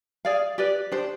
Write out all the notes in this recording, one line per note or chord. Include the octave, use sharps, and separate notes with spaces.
G#4 D5 F5
G4 B4 D5
D4 G4 C5